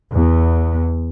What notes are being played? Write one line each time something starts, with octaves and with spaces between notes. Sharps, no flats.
E2